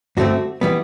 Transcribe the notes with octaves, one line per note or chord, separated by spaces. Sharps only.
G2 D3 A3 C4 F#4
E3 G3 B3